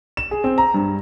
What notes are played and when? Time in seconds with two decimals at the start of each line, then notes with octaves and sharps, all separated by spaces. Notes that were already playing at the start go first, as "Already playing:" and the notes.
0.17 E7
0.31 G#4
0.44 C4
0.58 A#5
0.74 G2